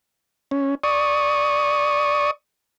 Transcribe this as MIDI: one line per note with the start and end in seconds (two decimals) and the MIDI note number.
0.51 0.75 61
0.84 2.31 74
0.84 2.31 85
0.84 2.31 87